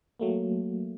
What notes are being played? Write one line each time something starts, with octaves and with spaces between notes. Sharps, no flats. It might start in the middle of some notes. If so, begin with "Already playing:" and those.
F#3 A3 A#3